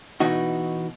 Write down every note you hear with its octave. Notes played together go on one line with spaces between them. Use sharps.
B2 E3 D#4 F#4